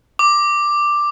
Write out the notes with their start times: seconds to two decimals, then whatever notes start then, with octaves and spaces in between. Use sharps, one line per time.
0.19 D6